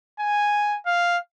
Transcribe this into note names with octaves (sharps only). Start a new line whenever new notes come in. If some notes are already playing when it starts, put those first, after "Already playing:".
G#5
F5